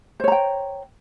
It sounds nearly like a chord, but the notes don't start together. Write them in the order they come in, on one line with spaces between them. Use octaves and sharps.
C5 C#5 A#5 G5